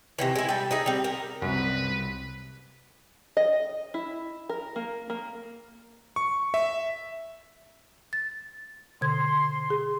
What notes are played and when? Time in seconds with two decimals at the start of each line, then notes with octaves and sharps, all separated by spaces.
0.18 C3 D#3 E3
0.35 G#3 E4
0.49 G3 A4
0.71 D#4 G#4 E5
0.86 G3 C4
1.04 A#4
1.42 C2 F#2 B4
3.37 D#5
3.94 E4
4.49 A#4
4.76 A#3
5.10 A#3
6.16 C#6
6.54 E5
8.13 A6
9.01 B2 D3 C6 G#6
9.70 G#4